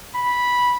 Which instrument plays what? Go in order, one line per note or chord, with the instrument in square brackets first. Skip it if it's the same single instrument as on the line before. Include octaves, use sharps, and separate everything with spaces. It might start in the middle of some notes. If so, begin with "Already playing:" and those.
[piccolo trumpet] B5